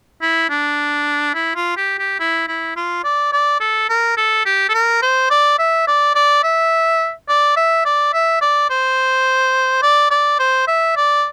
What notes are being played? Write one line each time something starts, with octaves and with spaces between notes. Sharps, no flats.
E4
D4
E4
F4
G4
G4
E4
E4
F4
D5
D5
A4
A#4
A4
G4
A4
A#4
C5
D5
E5
D5
D5
E5
D5
E5
D5
E5
D5
C5
D5
D5
C5
E5
D5